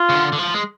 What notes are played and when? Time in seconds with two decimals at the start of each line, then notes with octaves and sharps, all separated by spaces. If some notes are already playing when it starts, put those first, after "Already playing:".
Already playing: F4
0.09 C#3
0.15 D3
0.33 D3
0.38 F3
0.54 G#3